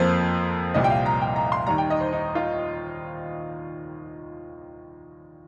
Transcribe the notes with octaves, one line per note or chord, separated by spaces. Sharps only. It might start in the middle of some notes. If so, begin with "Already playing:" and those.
Already playing: F2 F3 A#3 C5
C2 A#2 G3 D#5
G5
F5
A#5
G5
A#5
C6
D#2 D#3 G3 A#5
G5
D#5
C5
D#4
F4